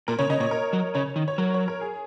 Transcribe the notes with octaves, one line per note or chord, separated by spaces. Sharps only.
A#2 A#4
C#3 C#5
C#3 D#5
A#2 C#5
A#4
F#3
C#3 C#5
D#3
C#5
F#3 A#4
C#5
A#4
G#4